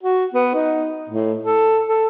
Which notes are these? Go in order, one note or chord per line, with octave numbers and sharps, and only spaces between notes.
F#4
B3
D#4
A2
A4
A4